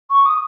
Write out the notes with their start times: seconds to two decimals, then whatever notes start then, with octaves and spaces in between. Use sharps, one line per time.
0.10 C#6
0.25 D#6